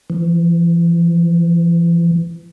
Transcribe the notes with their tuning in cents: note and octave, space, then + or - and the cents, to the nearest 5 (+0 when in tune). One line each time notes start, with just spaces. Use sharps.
E3 +45